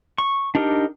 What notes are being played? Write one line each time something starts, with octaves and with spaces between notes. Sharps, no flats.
C#6
D4 D#4 G4 A#4